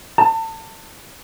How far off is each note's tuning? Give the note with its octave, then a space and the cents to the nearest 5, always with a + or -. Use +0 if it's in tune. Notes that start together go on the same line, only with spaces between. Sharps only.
A5 +35